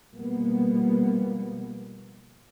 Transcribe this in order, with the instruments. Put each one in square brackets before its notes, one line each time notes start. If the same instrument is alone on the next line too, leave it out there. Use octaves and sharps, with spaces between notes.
[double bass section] B2 F3 G3 G#3 A#3 B3